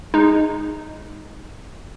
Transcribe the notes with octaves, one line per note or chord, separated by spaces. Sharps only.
G#3 D#4